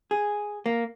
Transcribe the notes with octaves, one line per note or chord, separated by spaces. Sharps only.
G#4
A#3